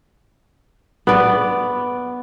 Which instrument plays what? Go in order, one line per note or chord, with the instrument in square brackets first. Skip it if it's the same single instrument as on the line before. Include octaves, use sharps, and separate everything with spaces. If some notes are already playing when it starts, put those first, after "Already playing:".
[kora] B3 D5